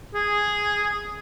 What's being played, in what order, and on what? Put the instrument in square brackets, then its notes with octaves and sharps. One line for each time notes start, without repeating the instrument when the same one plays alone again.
[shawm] G#4